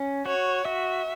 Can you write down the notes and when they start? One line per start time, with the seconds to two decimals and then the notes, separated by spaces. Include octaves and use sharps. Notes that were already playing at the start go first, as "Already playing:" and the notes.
Already playing: C#4
0.26 F#4 C#5
0.65 F#4 E5